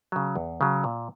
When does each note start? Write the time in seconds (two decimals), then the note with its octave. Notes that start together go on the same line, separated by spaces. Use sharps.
0.12 C#3 F#3
0.36 E2
0.61 C#3 F#3
0.84 A#2